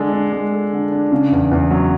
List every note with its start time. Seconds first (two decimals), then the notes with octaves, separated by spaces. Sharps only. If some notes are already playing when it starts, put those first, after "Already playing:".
Already playing: D3 G#3 D4 A4
0.13 D4
0.33 G#3
0.52 A4
0.73 D3
0.92 D4
1.12 C#3
1.32 E2
1.51 E2
1.71 F#3